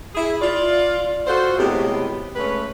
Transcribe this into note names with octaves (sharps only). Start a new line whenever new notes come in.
E4 G#4
F4 D5
F4 F#4 A4 C5
A2 C3 F#3 G#3 B3 G4
G#3 A3 C#4 B4